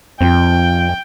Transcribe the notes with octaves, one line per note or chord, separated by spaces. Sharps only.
F2 F3 C4 G5